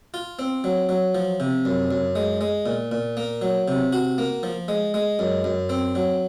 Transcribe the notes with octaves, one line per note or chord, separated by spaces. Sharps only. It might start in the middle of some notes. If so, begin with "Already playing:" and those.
F4
C4
F#3
F#3
F3
C3
F#2
F#2
G#3
G#3
A#2
A#2
A#3
F#3
C3
F#4
A#3
F3
G#3
G#3
F#2
F#2
C4
F#3